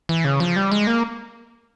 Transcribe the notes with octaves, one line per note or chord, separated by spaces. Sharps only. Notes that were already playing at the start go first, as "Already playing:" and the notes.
E3
C#3
F3
G3
G#3
A#3